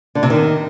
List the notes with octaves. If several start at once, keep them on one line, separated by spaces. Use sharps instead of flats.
D3
C3
D#3